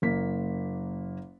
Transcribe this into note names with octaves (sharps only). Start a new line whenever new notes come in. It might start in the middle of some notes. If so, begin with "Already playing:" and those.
F#1 A#3 B6